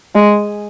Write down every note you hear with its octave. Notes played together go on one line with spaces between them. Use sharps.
G#3